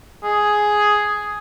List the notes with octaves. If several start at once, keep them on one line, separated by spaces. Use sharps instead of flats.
G#4